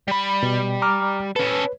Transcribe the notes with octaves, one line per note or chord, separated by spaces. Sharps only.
G3 B5
B2
A#5 D6 F6
C#4 A4 B4